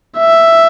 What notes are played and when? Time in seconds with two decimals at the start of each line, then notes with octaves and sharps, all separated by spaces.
0.18 E5